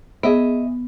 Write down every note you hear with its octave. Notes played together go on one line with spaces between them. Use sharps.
B3 G#4 D#5 E5